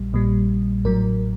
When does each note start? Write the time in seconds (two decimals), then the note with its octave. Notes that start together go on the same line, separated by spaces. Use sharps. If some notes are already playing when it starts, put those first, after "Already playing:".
Already playing: A#1 A#2 G3
0.13 A#1 A#2 G3
0.85 A1 A2 F#3 A#4